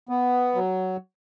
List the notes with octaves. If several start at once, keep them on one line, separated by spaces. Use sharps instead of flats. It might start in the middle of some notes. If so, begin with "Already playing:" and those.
B3
F#3